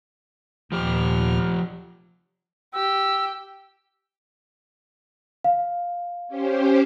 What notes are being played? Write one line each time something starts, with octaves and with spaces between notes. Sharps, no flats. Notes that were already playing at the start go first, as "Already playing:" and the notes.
D#2 A#2 F3 G4 F6
G4 E6
F5
C#4 G4 C5